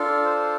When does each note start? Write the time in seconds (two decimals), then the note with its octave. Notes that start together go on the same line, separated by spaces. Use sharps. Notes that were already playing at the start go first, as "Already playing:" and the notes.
Already playing: D4 F4 A4
0.25 C5